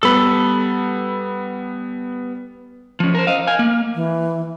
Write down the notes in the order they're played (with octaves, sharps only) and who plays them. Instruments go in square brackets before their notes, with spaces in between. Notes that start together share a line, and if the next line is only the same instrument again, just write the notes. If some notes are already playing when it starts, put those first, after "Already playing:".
[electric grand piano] G3 B3 [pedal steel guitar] A4 B5
[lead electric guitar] F3 C#4
A#4 C5
D#5 F5
F5 G#5
A#3
[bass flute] E3